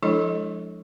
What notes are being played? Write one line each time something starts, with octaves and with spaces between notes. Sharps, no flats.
F3 G#3 D4 E4 A4 D#5